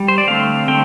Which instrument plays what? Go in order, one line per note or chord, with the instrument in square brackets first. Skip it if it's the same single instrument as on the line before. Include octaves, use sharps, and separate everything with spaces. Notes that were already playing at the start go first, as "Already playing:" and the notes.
Already playing: [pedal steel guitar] G3
C5
D5
D3 A3 C4 F5
D3 A3 C4 G5